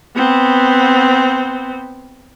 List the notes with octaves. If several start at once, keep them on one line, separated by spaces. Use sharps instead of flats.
B3 C4